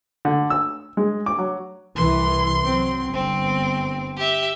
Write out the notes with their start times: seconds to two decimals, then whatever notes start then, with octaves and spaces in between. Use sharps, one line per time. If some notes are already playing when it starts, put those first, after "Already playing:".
0.25 D3
0.50 E6
0.97 G#3
1.26 D6
1.38 F#3
1.95 C2 E3 C6
2.64 F#3 C4
3.12 G1 C4
4.17 G4 E5